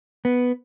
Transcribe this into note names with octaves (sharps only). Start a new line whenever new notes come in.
B3